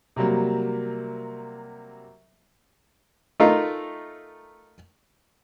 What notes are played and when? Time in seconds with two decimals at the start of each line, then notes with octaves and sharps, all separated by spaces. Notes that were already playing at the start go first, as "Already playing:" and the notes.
0.16 C3 F#3 G3 A#3
3.40 A3 D#4 F4 A#4